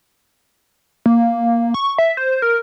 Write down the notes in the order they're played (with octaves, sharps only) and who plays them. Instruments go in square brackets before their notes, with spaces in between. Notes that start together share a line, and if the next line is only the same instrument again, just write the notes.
[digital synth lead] A#3
C#6
E5
C5
A#4